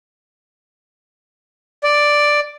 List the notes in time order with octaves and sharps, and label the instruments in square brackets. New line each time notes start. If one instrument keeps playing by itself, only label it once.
[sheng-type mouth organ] D5